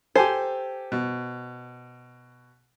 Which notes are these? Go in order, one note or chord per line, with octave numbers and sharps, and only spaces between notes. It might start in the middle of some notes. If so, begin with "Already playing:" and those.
G4 A4 C5 G#5
B2